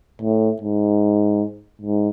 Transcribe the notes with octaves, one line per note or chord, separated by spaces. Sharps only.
A2
G#2
G#2